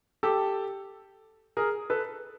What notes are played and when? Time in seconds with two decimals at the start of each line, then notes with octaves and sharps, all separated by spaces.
0.23 G4 A4
1.57 G#4 A#4
1.90 A4 B4